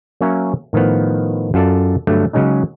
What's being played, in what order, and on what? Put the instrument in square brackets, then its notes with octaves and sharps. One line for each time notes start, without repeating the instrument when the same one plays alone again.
[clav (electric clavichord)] F#3 A#3 C#4 C#5 E5 A#5
A2 D#3 F3 B3
F#2 F4 A4 D5 A5
G2 D3 F#3 A3
C#3 F#3 G#3 C#4 D#4